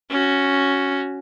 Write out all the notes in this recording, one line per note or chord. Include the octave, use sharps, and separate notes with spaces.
C#4 F#4